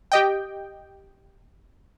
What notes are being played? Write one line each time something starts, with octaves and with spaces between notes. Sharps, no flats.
G4 D#5 G5